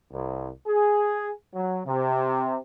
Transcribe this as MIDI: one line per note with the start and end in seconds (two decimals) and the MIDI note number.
0.13 0.48 36
0.67 1.30 68
1.54 1.81 54
1.86 2.58 48